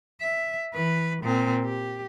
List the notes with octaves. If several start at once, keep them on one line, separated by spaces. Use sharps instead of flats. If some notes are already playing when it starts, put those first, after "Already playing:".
E5
E3 B4
A#2 C4
G4